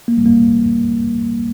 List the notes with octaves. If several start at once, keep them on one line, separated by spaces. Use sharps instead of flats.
A#3
G3
A#3